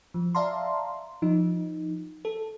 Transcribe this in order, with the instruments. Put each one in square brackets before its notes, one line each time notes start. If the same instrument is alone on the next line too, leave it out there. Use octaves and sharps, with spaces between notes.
[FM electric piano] F3
D5 E5 F5 A5 A#5 C6
F3 D#4
A4